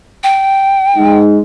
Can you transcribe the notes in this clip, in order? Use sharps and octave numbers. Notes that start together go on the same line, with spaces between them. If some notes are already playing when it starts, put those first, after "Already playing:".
G5
G#3 D#4